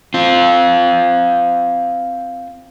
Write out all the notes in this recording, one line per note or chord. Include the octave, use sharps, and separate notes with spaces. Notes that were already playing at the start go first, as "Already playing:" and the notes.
C4 F4